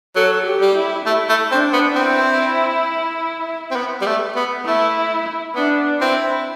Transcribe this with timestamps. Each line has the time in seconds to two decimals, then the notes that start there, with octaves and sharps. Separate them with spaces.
0.16 F#3 A4
0.46 G4
0.61 G3
0.75 E4
1.05 A3 E4
1.29 A3
1.51 C4 D4
1.73 B3
1.95 C4 E4
3.71 C4
3.76 B3
4.01 G3
4.06 A3
4.36 B3
4.65 A3 E4
5.55 B3 D4
6.00 C4 E4